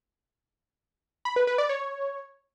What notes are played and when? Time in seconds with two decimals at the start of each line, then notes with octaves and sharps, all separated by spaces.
1.25 B5
1.36 B4
1.47 B4
1.58 D5
1.69 C#5